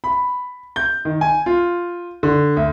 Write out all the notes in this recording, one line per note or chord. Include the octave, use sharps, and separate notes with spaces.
B5
G6
D#3
G#5
F4
D3
D2